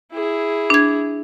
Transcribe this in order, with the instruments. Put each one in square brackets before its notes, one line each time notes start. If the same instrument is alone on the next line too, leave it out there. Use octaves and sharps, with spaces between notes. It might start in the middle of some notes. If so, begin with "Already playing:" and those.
[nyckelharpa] E4 G#4
[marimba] D4 G#6